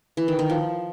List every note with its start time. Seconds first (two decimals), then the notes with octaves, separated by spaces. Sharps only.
0.17 E3
0.28 D#3
0.39 D#3
0.50 F3